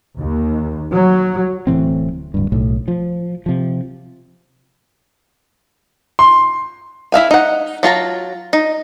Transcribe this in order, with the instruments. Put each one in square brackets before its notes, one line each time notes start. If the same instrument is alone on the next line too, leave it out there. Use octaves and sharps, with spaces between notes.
[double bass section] D#2
F#3
[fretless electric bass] D1 A2 E3 C4
D1 G2
B1 A2
F3
C3 F3
[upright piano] C6
[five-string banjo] E4 E5 F5 G#5
D#4 F#5
F#3 F4 A5 A#5
D#4